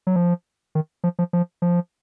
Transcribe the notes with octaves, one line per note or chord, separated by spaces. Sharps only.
F#3
F3
D#3
F3
F3
F3
F3